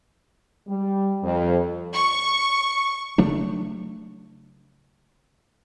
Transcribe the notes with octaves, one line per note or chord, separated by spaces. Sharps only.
G3
F2
C#6
C#3 F#3 A3 D4